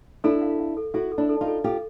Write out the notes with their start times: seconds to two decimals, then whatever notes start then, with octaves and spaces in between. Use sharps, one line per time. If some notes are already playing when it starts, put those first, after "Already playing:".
0.24 D4 E4 A4
0.42 F5
0.59 F5
0.77 A4
0.94 E4 F#4 A4
1.12 A4
1.18 D4 E4
1.29 A4
1.41 D#4 F4
1.47 A4
1.64 F4 G4 A4